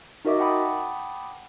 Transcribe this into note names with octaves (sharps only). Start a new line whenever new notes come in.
D#4 F#4 A#4 D#5 E5 D6
F#5 G5 A5 B5 D6 D#6